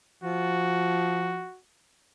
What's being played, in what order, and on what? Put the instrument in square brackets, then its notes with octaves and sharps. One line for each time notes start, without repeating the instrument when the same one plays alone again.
[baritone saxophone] F3 [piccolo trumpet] F#4